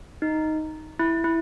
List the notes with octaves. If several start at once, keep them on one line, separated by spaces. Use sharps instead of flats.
D#4
E4
E4